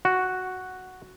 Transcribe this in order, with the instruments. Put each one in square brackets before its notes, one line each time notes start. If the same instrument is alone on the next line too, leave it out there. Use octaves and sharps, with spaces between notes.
[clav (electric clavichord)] F#4